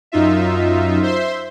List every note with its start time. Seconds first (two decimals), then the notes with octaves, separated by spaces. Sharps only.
0.12 F#2 D#4 F4 E5
1.02 C5 E5 C6